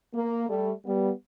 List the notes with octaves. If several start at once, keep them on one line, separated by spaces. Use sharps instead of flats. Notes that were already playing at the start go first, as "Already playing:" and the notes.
A#3
G3 A3
G3 B3